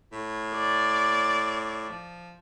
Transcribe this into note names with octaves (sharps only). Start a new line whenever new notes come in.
A2
D5
F3